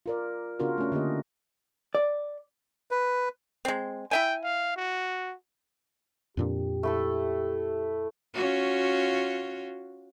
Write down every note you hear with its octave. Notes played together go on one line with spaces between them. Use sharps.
F4 A#4 D5
C#3 B3 D4 F4 F#4 A#4
A3 C#4
D3 A#3 G4 D#5
D5
B4
G#3 C4
E4 E5 G5 G#5
F5
F#4
F2 A#2 D4 G4
A3 E4 A4
C#4 F4 F#4